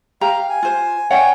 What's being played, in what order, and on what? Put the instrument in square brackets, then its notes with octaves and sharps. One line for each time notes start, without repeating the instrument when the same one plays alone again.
[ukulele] G4 A#5 [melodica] F5
[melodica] G#5
[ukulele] F4 C5
[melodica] C#4 G5 [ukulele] C#5 D5 F#5